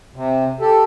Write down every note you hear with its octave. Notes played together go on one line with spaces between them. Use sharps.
C3
G4 A4